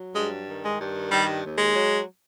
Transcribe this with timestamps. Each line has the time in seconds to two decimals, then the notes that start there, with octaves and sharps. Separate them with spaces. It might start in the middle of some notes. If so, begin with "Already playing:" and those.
Already playing: F#3
0.14 G2 G#3
0.47 D#3
0.62 G#3
0.79 G2
1.10 D#3 G3
1.41 D#2
1.57 G#3
1.73 F#3